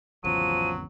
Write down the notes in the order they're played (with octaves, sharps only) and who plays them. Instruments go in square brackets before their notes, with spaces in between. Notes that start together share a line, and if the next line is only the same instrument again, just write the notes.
[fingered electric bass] G#1 E2 C#3 [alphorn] F3 [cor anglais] F#3 [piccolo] D#7